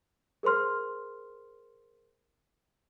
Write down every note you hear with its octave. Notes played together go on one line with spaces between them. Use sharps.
G#4 A#4 C5 C6 F6